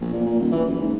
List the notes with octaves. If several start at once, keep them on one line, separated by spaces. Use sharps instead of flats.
A#1
A#2
A#2
D#1
E3
F#1
G#2